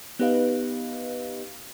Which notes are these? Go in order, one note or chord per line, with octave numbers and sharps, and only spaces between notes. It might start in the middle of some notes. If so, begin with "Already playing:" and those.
B3 D#4 G4 B4 D#5 F5